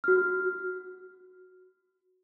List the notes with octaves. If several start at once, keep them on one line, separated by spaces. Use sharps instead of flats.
F#4 F6